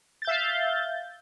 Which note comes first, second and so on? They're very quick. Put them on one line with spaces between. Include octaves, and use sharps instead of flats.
A6 G6 E5 F5